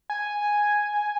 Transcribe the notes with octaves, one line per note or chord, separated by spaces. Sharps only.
G#5